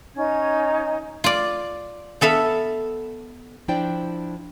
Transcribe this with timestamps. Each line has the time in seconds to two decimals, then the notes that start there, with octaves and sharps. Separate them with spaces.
0.15 C#4 D#4 C#5 G#6
1.24 F4 D5
2.21 B3 A4 E5 F5
3.68 F3 D4 E4 C5 D5 G5